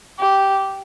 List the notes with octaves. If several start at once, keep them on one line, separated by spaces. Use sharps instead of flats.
G4